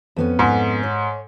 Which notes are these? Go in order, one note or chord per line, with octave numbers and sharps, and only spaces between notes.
F2 B3 C#4
G#2
C#5